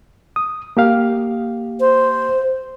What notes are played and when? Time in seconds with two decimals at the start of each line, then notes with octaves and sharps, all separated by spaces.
0.36 D#6
0.77 A#3 G4 F5
1.80 C5